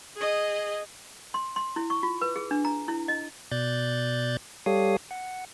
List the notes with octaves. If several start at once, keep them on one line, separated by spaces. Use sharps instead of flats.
G#4 D#5
C6
C6
E4
C#6
F4
B4
G#4
D4
A#5
E4
D#5
B2 D5 F#6 G6 A6
G3 G4 A4 C#5 F5 D#6
F#5